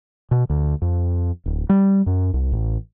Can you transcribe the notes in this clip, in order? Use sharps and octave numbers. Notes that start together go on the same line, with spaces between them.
B2
D2
F2
D1
G3
F#2
C2
A1